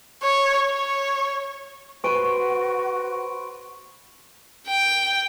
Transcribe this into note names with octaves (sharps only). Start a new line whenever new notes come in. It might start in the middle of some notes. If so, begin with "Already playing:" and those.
C#5
C#5
F#4 B4 C5 C6 C#6 D7 D#7
G5